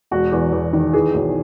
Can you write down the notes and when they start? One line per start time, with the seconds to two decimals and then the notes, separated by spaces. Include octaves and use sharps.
0.11 E1 F#4
0.32 E2
0.52 E2
0.73 D#3
0.93 E3 G#4
1.14 B1